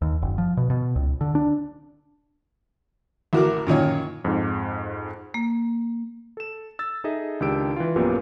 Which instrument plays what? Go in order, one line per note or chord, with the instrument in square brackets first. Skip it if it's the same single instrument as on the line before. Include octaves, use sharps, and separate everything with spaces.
[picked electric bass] D#2
F#1
F3
B2
B2
C#2
D3
D4
[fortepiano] A1 F#4 A#4 D6
F#2 A#2 D#3 C#5
[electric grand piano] F2 G#2
[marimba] A#3
[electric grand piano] A4 E7
E6 A6
D#4 G#4 A4 D#5 E5
C#2 D#3 D4 G4 E6 D7
E3 F4
A#1 F#2 A#2 B3 G4 A#4